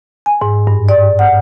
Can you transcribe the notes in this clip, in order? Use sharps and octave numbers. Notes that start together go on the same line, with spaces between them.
G#5
G#2
G2
D5
F#5